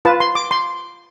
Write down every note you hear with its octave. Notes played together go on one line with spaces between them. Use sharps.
F4 B4 A5
C6
D6
C6